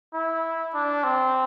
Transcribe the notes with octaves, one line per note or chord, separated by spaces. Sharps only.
E4
D4
C4